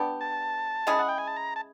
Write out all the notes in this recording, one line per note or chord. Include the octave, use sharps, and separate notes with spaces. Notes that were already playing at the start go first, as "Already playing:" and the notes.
Already playing: G3 B3 D4 G4
A5
G#3 C#4 E4 G#4
F#5
G5
G#5
A5
A#5
A5